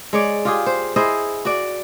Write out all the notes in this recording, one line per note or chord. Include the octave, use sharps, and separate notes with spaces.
G#3 C#5 D5
F4 G4 G#4
C5
E4 G#4 C5 D#5
F#4 D5